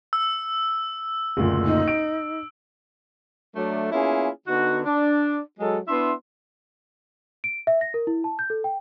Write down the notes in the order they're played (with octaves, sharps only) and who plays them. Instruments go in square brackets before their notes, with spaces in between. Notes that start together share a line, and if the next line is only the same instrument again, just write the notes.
[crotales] E6
[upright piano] F#1 D2 A#2
[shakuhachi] D#4
[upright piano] D7
[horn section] F#3 A3 D4
A#3 B3 C#4 E4 F4 G#4
D3 B3 D#4 F#4
D4
F#3 G#3 A4
B3 D4 E4 E5 C6
[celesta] D7
E5
A#6
A#4
E4
A5
G6
A4
G5